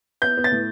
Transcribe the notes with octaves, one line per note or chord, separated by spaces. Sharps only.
B3 G6
B3
A6
A2